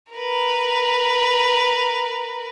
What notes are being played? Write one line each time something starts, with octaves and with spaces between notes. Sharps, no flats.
A#4 B4